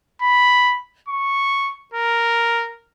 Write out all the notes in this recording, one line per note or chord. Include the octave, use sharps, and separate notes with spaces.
B5
C#6
A#4